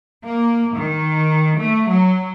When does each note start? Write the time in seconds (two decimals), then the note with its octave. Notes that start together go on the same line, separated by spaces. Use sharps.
0.24 A#3
0.76 D#3
1.59 A3
1.89 F#3